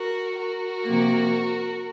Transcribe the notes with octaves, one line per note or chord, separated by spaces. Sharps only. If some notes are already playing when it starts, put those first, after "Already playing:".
Already playing: F#4 A#4
F#4 A#4
C3 F3 A#3